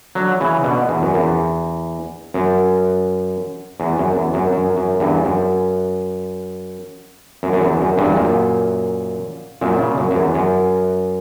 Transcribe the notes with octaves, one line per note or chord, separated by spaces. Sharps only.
D3 F#3
C#3 E3
B2 D3
E2
F#2
E2
F#2
E2
F#2
E2
F#2
F#2
F#2
E2 G2
F#2
F#2
F#2
E2
F#2
E2 G2
F#2 A#2
F#2 A#2
A#2 C#3
F#2
F#2
E2
F#2